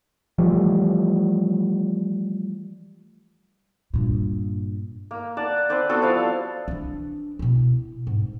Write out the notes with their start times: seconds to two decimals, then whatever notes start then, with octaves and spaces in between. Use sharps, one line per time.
0.38 E3 F3 G3 A3
3.93 G2 A#2
5.11 A#3
5.37 D5 F#5 A5
5.69 C4 B4 C5 D5
5.90 B3 C4 F#4 A4
6.02 F3 G3 E4 F5
6.68 E3 D4
7.39 B2 E4
8.07 G#2